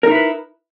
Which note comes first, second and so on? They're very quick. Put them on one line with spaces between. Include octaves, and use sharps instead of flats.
A#4 D#4 E4 B4